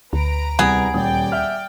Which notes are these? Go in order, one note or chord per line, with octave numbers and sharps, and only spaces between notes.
D2 B4 A#5 D7
C2 B3 G#4
D#1 D5 G5 D#6
E5 F#5 F6